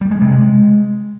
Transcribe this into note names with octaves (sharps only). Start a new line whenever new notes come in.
G3
G#3
C3
G#3